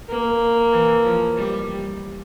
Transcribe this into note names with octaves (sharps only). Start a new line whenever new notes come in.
A#3
E3
F3
G3